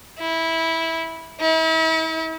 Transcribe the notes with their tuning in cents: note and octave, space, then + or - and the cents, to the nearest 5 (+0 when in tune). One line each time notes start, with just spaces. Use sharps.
E4 -15
E4 -40